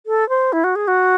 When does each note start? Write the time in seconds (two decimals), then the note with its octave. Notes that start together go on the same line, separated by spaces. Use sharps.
0.06 A4
0.29 C5
0.53 E4
0.64 F#4
0.76 G#4
0.88 F#4